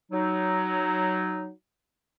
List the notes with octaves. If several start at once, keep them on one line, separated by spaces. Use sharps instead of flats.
F#3 D#4